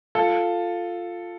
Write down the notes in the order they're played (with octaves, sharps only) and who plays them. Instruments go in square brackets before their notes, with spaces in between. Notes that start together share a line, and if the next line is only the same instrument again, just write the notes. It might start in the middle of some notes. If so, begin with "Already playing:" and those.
[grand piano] F4 A4